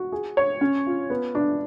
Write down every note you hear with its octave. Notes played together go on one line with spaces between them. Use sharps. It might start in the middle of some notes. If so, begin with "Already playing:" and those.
Already playing: F#4
G#4
C#5
C#4
F4
B3
D4